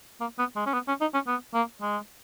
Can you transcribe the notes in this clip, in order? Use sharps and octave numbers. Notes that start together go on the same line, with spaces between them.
A#3
B3
G#3
C#4
B3
C#4
D#4
C#4
B3
A#3
G#3